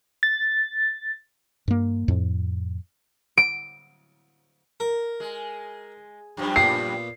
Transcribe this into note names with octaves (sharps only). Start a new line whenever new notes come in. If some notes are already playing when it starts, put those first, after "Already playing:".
A6
G2 A#3
F2 A2
D7
A#4
G#3
F#2 F3 G3
A#2 B3 C7